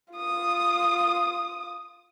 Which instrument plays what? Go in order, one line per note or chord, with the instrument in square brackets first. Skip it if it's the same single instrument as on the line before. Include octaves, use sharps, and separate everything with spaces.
[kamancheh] F4 D#6